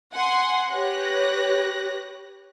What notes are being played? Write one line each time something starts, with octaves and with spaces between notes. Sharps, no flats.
F#5 G#5 C6
G4 B4 C#5 F#6 A#6